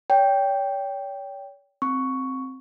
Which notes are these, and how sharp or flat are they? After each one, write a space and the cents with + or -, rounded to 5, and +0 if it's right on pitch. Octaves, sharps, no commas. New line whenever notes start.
C#5 +40 G5 +0
C4 +0 C#6 +5